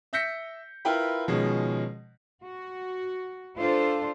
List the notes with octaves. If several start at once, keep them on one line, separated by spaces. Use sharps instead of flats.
E5 E6 G6 A#6 B6 C#7
E4 F4 A#4 B4 G5 B5
B2 D#3 F3 G#3 C#4
F#4
D4 F4 A4 C5